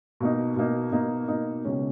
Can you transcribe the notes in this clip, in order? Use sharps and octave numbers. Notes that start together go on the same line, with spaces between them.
B2 A#3 D#4
B2 A#3 D#4
B2 A#3 D#4
B2 A#3 D#4
C#2 B2 G#3 C#4